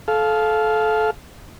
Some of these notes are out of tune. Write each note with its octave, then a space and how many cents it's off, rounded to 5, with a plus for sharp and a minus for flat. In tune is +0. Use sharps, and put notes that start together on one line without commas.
A4 -25 F5 +0